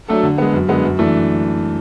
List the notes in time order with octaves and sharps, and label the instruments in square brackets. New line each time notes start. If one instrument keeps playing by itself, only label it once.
[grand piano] F#3 A3 D4 A4
D3
G#3 B3
F#2
D3 G#3 B3
F#2
E3 A3 D4